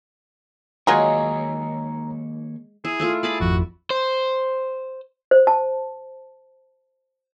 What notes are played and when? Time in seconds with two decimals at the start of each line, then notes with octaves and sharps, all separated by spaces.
0.87 D#3 F#3 G#3 A#3 F4 G#4 C#5 A#5
2.85 E4 G#4
3.00 A3 E4 F4
3.23 G#4 D5 A5 B5
3.40 G#1 F2 F#4
3.90 C5
5.31 C5
5.47 A5